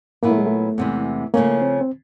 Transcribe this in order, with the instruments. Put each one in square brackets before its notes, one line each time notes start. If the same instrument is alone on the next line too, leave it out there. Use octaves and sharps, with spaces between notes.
[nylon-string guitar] A#2 F#3 B3 E4 [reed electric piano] A#3
[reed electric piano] A3
G#3
A3
[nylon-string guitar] E2 C3 E3 G#3
[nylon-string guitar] C#3 F3 A3 C#4 [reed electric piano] A#3
[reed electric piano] C4
C4